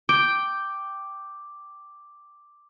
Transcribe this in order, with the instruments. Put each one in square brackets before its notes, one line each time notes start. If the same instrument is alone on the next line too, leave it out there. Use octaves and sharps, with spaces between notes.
[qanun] G5 [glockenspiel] D6